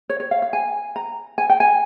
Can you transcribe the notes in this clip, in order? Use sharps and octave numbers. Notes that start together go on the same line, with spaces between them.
C#5
C#5
F5
F5
G#5
A#5
G#5
G5
G#5